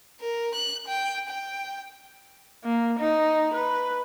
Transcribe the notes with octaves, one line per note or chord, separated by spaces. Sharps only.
A#4
F#6
G5
G5
A#3
D#4
B4